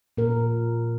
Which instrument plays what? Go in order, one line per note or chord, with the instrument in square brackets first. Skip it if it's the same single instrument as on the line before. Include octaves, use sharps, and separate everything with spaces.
[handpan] A#2 A#4